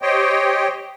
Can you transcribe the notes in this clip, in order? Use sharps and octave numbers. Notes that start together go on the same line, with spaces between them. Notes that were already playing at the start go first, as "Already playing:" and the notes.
G4 C5 C#5 D#5 G5